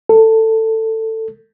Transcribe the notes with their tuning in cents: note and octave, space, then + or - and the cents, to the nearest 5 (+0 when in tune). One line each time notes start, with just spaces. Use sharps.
A4 +15